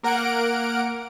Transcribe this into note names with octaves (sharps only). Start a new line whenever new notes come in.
A#3 A#4 F#5 D7